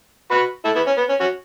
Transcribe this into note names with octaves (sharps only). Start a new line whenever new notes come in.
F#4 B4
E4 A4
B3 E4
C#4
B3
C#4
C#4 F#4